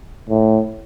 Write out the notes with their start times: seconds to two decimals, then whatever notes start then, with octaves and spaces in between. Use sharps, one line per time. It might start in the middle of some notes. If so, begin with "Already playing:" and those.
0.29 A2